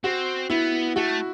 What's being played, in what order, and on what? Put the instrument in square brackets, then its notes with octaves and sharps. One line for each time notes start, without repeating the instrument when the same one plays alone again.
[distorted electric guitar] C4 [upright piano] F#4
[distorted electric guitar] B3 [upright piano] E4
[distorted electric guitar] A3 [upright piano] F#4